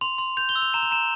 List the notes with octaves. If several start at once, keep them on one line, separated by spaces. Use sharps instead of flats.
C6 F7
C6
G6 F7
G7
E6
F7
A#5 E7
F7
A#5 E7